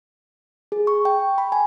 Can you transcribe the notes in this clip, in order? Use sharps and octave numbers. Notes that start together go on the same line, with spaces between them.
G#4
C#6
G5
B5
G#5